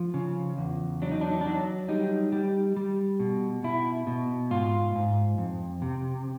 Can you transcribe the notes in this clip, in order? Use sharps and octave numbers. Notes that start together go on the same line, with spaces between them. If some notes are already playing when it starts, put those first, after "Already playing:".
Already playing: F3
C#3
E2
F#3 D4
D#4
D4
D#4
D4
F#3
G3 D#4
G3
G3
B2
B2 E4
B2
G#2 F4
G#2
F2
C3